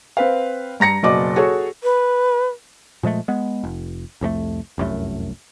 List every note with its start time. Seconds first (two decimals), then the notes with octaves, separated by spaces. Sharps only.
0.17 C4 B4 F5
0.80 G2 A#5 A#6 C#7
1.03 F#1 B2 D5 D#5 D6
1.36 F#4 G#4 A4 C#5
1.84 B4
3.03 A#2 F3 G#3 A3
3.28 G#3 B3
3.64 F1
4.21 C2 F2 G#3 A3
4.78 F1 C2 F#2 A3